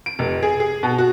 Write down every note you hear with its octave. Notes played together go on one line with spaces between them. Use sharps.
D7
F1
G#4
G#4
B2
F#4